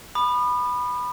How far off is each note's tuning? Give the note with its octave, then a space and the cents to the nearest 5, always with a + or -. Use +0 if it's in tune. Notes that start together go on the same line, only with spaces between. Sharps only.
B5 +0 D#6 -40